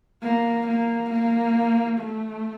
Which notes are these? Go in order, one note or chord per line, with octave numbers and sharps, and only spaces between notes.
A#3
A#3
A#3
A3